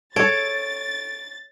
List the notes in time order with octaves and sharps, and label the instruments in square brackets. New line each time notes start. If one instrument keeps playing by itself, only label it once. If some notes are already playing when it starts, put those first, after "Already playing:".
[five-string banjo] A4 [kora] C#5 [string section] A6 [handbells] D7